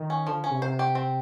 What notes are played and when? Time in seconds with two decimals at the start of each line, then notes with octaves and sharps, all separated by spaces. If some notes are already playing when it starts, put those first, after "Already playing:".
Already playing: D#3
0.10 C#4
0.27 D3 F3
0.44 C#4
0.50 C3
0.61 C3 C5
0.79 G4
0.95 C4